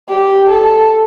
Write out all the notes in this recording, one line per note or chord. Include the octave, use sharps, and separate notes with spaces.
G4
A4